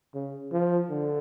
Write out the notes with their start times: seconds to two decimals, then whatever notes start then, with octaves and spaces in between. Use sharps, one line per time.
0.15 C#3
0.52 F3
0.90 D3